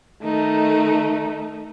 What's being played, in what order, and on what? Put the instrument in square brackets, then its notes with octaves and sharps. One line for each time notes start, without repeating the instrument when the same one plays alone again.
[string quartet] D#3 D#4 [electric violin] A3